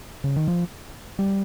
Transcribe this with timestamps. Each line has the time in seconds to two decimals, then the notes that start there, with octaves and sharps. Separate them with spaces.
0.24 C#3
0.36 D#3
0.48 F3
1.19 G3